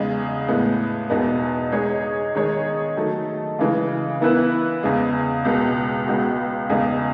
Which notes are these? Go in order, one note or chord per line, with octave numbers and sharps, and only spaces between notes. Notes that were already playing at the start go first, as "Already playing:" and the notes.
Already playing: E2 C#3 G#3 D#4
A2 G#3 B3
E2 B2 G#3 B3 D#4
G#3 D#4 G#4 C#5
D#3 G#3 D#4 G#4 C#5
D#3 F#3 A3
C#3 E3 G#3
E3 B3 E4 B4
E2 C#3 G#3
C#2 B2 G#3 B3
C#2 C#3 G#3 B3 F#4
E2 C#3 G#3 D#4